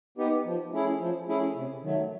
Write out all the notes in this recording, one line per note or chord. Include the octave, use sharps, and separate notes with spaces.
B3 D#4 G4
F3
A3 C#4 E4 G#4
F3
A3 C#4 E4 G#4
C3
D#3 F#3 A3